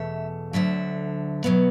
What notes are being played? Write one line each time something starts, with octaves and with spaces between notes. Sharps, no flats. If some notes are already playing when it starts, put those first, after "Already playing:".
Already playing: E2 B2 A3 E5
D2 D3 F#3 E5
B2 F#3 B3